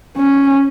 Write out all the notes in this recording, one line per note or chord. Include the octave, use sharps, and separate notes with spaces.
C#4